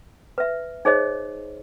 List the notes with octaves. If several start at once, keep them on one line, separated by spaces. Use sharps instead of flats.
B4 E5
D#4 G#4 C5 C#5 D#5